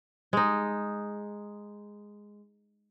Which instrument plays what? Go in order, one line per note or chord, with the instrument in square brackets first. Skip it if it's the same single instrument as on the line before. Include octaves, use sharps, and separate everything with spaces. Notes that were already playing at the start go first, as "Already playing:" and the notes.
[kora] G#3 D#4